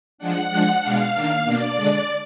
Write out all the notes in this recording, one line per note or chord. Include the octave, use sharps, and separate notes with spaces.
F3 G#3 D4 F#5
F3 G#3 D4
B2 G#3 D4 F5
D#3 A#3 D4
B2 A#3 D4 D5
D3 G#3 D4